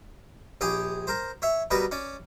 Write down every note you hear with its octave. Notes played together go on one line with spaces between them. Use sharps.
A#1 G4 G#4 D#6
A#4 C5
C#5 E5
B2 G3 A#4 B4 D5 D#6
C#4 D5